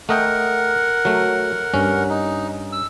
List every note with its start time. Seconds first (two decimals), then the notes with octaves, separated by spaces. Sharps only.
0.09 A3 A#4 D#5 F#5 G5
1.05 F#3 A3
1.74 G2 C#4
2.10 D#4
2.72 E6